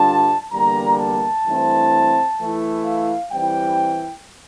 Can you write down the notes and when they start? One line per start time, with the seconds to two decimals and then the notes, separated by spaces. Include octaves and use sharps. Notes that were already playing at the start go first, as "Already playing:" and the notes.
Already playing: G2 D3 G3 D4 F4 A5
0.52 E2 D3 G3 A#3 A#5
0.98 A5
1.45 G2 E3 A3 C4 E4
2.39 E3 A3 E4
2.85 F5
3.32 E3 G3 C4 E4 G5